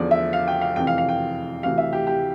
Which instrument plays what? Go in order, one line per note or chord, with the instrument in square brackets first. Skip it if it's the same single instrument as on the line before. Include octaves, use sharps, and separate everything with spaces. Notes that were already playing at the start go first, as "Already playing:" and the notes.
Already playing: [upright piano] E2 D3 F3 D5
E5
F5
G5
F5
F2 C3 E3 G5
F5
F5
G5
D2 C3 E3 F5
E5
G4
G4